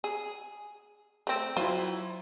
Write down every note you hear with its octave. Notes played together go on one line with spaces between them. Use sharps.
G#4
A3 C4
F#3 E4 F4 C5